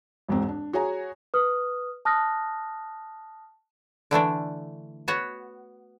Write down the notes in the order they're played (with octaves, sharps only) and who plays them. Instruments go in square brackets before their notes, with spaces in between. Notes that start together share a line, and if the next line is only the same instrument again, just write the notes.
[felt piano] E1 G#2 C4
D4
F#4 G#4 C#5 G#5 A#5
[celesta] B4 D#6 F6
A5 D#6 F6 F#6 A#6
[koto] D3 E3 A3 D4
B3 F#4 C#5 F#5